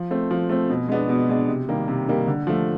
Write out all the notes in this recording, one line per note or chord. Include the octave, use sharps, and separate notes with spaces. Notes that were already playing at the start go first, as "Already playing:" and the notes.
Already playing: F3
A3 C4
F3
A3 C4
B2
G#3 B3 D4
B2
G#3 B3 D4
C3
D#3 G3 A#3
C3
D#3 G3 A#3
D3
F3 A3